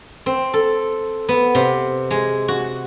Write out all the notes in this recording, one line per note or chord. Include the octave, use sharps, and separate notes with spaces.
C4
A4
B3
C3
G#3
F#4